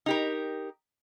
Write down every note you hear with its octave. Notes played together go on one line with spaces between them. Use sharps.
D#4 G4 A#4